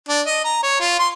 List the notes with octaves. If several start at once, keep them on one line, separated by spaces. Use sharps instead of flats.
D4
D#5
A#5
C#5
F4
C6